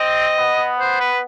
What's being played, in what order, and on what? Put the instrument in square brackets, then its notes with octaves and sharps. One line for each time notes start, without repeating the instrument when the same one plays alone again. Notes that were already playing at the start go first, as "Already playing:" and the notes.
Already playing: [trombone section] C4 [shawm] D#5
[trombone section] B3
[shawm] C5
B4